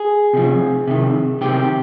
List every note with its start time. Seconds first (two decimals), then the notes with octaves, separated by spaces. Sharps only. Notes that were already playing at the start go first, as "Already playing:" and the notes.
Already playing: G#4
0.33 C3 F3
0.88 C3 D#3
1.41 C3 D#3 G4